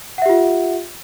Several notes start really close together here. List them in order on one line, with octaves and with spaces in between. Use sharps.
F#5 E5 G4 F4